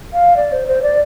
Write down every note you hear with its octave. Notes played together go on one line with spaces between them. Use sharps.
F5
D5
C5
C5
D5